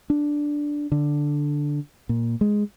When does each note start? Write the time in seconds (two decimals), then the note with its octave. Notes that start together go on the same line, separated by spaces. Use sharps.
0.10 D4
0.92 D3
2.09 A#2
2.41 G#3